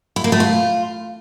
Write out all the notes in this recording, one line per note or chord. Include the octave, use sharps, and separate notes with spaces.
E4
A#3
A3
F4